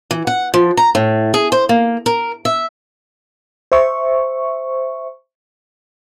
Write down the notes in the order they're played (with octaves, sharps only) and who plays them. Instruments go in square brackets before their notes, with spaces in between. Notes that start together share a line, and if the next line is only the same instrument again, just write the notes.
[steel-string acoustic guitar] E3
F#5
F3
A#5
A2
G#4
C5
A#3
A#4
E5
[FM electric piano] C5 E5 C#6